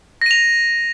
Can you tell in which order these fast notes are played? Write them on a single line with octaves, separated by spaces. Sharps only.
A#6 D#7 F7